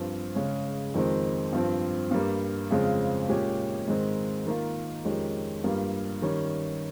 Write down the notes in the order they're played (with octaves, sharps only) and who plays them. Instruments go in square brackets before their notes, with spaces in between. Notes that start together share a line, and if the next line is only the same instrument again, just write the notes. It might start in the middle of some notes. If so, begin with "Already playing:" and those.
Already playing: [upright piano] G2 F3 C4
C#3 G#3 C#4
F2 D#3 G#3 C4
G2 F3 C4
G2 G3 A#3
F2 C#3 G#3 C4 F4
A#2 G#3 C#4 G4
G#2 D#3 G#3 C4
D#3 A#3 F4
F2 D#3 G#3 C#4 G4
G2 G3 A#3 F4
D#3 G3 C#4